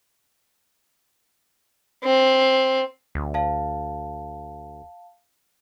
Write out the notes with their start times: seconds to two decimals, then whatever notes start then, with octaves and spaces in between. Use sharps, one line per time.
2.04 C4
3.15 D2
3.34 F5 A5